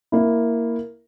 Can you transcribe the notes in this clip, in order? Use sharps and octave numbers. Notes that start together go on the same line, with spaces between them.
A#3 E4